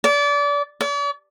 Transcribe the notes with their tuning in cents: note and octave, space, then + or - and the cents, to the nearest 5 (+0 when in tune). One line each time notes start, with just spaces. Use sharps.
D5 -30
D5 -45